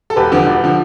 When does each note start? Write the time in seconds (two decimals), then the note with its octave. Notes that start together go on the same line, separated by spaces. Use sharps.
0.10 A4
0.16 E1 G4 B4
0.32 E2 D3 F3
0.46 E1
0.64 D3 F3